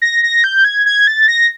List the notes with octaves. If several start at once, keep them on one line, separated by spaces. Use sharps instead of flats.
A#6
A#6
G6
G#6
G#6
A6
A#6